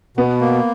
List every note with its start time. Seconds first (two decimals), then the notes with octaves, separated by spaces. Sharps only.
0.17 B2 B3
0.41 A#3